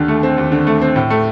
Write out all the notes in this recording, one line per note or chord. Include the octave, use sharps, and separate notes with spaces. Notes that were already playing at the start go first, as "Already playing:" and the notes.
Already playing: D#2 D3
A3
C4
D#2
D3
A3
C4
A2
A3